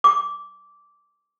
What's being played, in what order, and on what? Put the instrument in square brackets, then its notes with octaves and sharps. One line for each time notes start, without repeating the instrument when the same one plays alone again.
[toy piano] D6